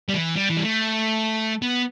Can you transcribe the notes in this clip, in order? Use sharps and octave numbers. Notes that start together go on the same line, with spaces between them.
G3
E3
G3
E3
G3
A3
B3